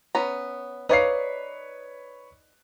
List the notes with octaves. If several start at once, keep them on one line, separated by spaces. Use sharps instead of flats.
B3 C#4 A#5
D#4 B4 C#5 D5 F5 C7